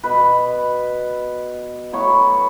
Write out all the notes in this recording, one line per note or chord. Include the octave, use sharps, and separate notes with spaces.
B2 B3 B4
A2 F#3 B3 C#5